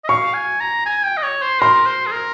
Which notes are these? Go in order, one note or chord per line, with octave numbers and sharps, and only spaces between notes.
D#5
F5 C#6
G#5
A#5
G#5
G5
D#5
C#5
C5
A#4 C6
C5
G#4
A#4